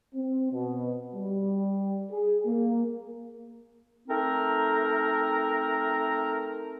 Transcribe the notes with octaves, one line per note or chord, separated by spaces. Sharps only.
C4
B2
G3
G#4
A#3
A3 C4 D#4 A#4